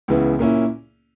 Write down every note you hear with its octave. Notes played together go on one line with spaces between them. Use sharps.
C#2 C#3 E3 B3 E4
A#2 A#3 C#4 E4